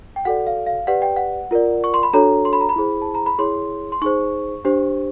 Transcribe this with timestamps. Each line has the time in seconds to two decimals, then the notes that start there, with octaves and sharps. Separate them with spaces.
0.16 G5
0.25 F#4 A4 D5 F#5
0.47 F5
0.66 F5
0.87 G4 B4 D5 F#5
1.02 G5
1.16 F#5
1.51 F4 A#4 D5
1.84 C#6
1.94 C6
2.03 B5
2.13 D4 F#4 A4 C#5 A#5
2.45 C6
2.53 B5
2.61 A#5
2.69 B5
2.76 E4 G#4 C5
3.02 A5
3.14 A#5
3.26 B5
3.39 E4 G#4 C#5 C6
3.92 C6
4.02 D#4 G#4 C5 C#6
4.65 D4 G4 C5